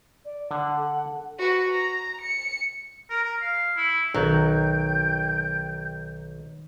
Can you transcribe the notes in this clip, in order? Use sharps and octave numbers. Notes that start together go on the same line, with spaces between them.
D5
D3 F#5
A4
F#4 B4
A#5
C#7
A#4
A#4
F5
E4
B1 D#3 F#3 G5 G6